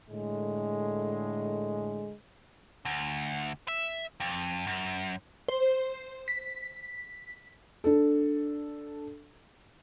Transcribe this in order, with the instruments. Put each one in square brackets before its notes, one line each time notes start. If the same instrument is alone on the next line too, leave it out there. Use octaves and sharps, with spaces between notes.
[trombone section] A2 D3 G#3
[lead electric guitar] D2
E5
F2
F#2
[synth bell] C5
B6
[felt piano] D4 A4